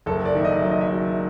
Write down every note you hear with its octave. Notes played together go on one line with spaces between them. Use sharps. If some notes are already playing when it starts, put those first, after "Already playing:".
F#1 A4
D5
D#3 E5
D#5
F#2 E5
D#5
E5
F#3